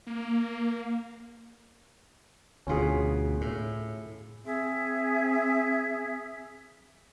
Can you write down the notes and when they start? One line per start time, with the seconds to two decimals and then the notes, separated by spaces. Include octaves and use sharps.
0.07 A#3
2.67 D2 B2 C#4 F4 G#4
3.41 A2
4.45 C4 G#4 E5